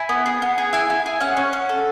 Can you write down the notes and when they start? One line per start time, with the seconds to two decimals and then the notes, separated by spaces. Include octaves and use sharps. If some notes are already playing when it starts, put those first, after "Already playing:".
Already playing: E4 G#5
0.09 B3
0.26 G#4
0.42 B3
0.58 G#4
0.73 E4 G#5
0.90 E4
1.06 G#4
1.20 C#4 F#5
1.37 C#4
1.53 C#4
1.69 A4